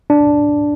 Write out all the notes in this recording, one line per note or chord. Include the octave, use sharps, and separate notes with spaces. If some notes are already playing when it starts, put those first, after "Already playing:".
D4